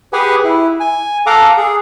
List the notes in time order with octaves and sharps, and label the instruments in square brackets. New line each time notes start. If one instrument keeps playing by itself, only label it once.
[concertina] G4 G#4 B4 F#5 G#5
E4
G#5
A4 F5 F#5 A#5 D6
G#4